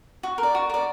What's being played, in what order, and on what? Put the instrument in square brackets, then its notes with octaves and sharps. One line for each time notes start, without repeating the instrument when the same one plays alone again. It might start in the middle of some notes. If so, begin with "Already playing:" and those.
[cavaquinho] F#4
A#4
D5
F#4
A#4 D5